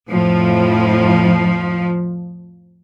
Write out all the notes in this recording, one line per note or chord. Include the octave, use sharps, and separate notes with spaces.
F2 A2 F3